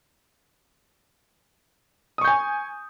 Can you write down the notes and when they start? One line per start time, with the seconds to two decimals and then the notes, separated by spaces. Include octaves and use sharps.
2.18 D#6
2.21 C#6
2.24 G6
2.28 G#5